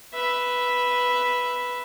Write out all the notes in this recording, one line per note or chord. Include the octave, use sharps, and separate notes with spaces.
B4 E5